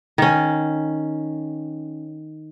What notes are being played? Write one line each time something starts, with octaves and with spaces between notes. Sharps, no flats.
D#3 C#4